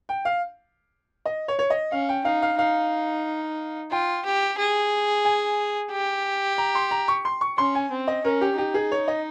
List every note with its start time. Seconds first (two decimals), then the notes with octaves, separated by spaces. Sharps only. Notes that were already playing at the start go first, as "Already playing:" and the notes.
0.09 G5
0.25 F5
1.25 D#5
1.48 C#5
1.59 C#5
1.70 D#5
1.92 C#4 F5
2.09 G5
2.25 D#4 F5
2.42 F5
2.58 D#4 F5
3.92 F4 G5
4.25 G4
4.58 G#4
5.25 G#5
5.91 G4
6.58 A#5
6.75 C6
6.91 A#5
7.08 C#6
7.25 C6
7.41 C#6
7.58 C#4 C6
7.75 G#5
7.91 C4
8.08 D#5
8.24 C#4 A#4
8.41 G4
8.58 D#4 G4
8.74 G#4
8.92 C#5
9.08 D#5